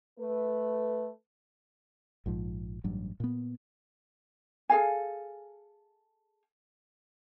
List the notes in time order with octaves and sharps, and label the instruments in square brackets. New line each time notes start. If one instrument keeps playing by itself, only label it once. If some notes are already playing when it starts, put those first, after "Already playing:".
[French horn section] A3 B4
[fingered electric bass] A#1 G#2 F3
A1 G2 F#3
A#2 B3
[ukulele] G#4 A4 F5 G#5